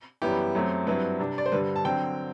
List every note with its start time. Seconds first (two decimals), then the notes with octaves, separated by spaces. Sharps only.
0.22 F#2 E3 G3 B3 E4 G4
0.55 F#2 F#3 A3 C4
0.87 G2 F#3 C4 E4 B4
1.19 C3 G3 D4
1.38 D5
1.46 C5
1.52 G2 D3 G3 B4
1.76 A5
1.85 D3 F#3 C4 G5